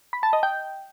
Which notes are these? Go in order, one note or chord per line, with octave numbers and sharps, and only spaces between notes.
B5
A5
D#5
G5